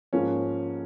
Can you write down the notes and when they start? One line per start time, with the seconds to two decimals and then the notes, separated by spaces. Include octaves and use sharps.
0.13 G#2 F3 A#3 C#4